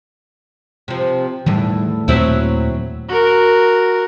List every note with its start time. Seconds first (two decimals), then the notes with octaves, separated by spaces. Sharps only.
0.88 C3 F3
1.46 E2 A2 D#3 G3
2.08 D#2 A#2 F#3 A3 C4 E4
3.08 F#4 A#4